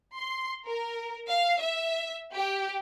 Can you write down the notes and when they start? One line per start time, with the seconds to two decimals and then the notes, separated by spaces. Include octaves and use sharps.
0.16 C6
0.66 A#4
1.28 F5
1.60 E5
2.34 G4